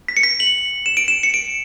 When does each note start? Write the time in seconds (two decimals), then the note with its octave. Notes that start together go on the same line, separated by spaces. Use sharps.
0.08 B6
0.17 C#7
0.23 B6
0.40 F#7
0.86 E7
0.97 D7
1.08 E7
1.23 C#7
1.34 D7